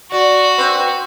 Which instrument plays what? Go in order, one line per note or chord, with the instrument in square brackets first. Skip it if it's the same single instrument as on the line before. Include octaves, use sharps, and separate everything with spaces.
[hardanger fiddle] F#4 [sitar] D5
[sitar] C4 B4